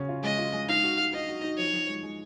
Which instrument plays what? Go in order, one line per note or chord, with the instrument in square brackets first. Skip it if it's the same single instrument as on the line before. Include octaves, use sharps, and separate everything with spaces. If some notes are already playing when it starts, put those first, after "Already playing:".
Already playing: [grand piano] C#3 C#4 F#4
F4
[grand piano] G#3 [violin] D#5
[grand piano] F4
G#3
[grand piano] D#4 [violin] F5
[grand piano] F#4
F#4
[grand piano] D#4 [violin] D#5
[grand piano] F#4
D#4
[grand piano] F3 [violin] C#5
[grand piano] F3
G#3
G#3